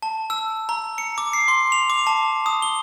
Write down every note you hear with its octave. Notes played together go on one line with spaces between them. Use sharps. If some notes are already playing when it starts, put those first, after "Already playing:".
A5
E6
A#5
C#7
D6
C7
C6
F7
D6
A5
D#6
G7